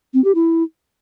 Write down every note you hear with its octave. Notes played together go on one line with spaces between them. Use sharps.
C4
G4
E4